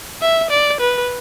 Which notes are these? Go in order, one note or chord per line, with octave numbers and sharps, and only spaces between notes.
E5
D5
B4